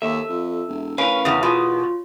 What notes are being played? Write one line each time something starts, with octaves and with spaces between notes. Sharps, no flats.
D#2 A4 E5
F2
E1
A1 C#4 A#4 B4 F5
E2 C#3 D#6
E2 B2 F4